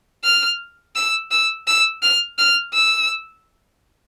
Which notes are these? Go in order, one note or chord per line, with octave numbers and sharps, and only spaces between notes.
F6
E6
E6
E6
F6
F6
E6